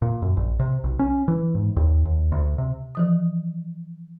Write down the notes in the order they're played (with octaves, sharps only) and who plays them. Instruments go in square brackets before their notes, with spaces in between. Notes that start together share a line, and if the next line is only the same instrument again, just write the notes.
[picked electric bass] A#2
F#2
A#1
C3
B1
C#4
E3
G#2
D#2
D#2
D2
C3
[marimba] E3 F3 D#6